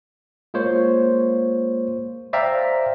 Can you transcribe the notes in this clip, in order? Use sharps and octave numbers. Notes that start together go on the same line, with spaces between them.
G#3 A#3 F4 C5 C#5
C5 D5 E5 F5 G5 A#5